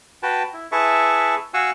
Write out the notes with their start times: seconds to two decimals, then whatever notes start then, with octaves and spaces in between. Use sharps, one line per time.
0.23 F#4 B4 G5 A5
0.54 E4
0.72 E4 G#4 B4 E5 A5 C#6
1.54 F#4 F5 F#5 G#5 C#6 E6